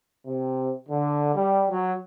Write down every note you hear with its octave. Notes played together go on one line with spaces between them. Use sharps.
C3
D3
G3
F#3